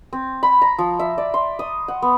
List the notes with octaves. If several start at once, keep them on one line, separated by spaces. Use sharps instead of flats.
C4
B5
A#5
F3
E5
D5
C6
D#6
F#5
B3